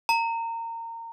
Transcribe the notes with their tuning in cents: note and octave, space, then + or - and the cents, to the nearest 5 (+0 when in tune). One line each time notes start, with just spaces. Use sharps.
A#5 -25